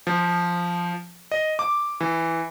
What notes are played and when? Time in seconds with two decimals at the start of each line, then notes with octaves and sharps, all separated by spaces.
0.07 F3
1.32 D#5
1.59 D6
2.01 E3